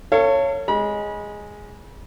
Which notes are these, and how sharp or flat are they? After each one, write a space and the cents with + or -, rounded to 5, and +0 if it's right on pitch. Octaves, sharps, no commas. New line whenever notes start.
A4 +35 C#5 +0 F5 -30
G#3 +0 B5 -35